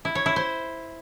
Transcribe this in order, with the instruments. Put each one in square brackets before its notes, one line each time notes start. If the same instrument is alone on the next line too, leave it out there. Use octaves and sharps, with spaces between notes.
[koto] E4
C#5
E4
C5